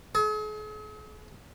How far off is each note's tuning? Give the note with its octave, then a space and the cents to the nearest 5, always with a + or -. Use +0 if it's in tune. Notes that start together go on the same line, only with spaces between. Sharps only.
G#4 +45